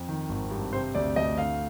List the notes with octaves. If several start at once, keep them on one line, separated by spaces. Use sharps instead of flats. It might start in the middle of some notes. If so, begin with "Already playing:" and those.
Already playing: F2
D#3
G#1
G2
C3 C5
D2 D5
D2 D#5
D3 F5